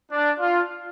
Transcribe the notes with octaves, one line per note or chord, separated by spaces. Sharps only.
D4
F4